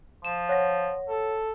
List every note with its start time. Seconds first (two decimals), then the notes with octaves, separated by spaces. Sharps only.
0.25 F3 E7
0.49 C#5 F#5 A#6
1.09 A4